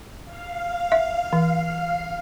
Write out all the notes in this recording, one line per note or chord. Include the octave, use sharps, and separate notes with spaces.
F5
E5
E3